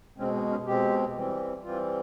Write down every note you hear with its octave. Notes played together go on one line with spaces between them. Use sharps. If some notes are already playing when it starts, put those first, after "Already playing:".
B2 G#3 C4 C#4
C4
C#4
B2 G#3 C4 G4
E3 G3 C4
E3 G3 C4 F4